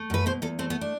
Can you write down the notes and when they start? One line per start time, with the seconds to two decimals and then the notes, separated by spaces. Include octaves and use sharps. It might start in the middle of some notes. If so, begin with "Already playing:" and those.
Already playing: A3
0.10 F#2 B4
0.26 B2 C5
0.42 E2 A4
0.59 A3 C4
0.70 B3
0.81 D4